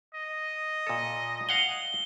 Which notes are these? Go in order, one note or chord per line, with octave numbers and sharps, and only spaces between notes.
D#5
A#2 A4
F5 F#5 G#5 G7